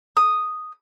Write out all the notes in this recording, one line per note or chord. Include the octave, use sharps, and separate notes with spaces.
D#6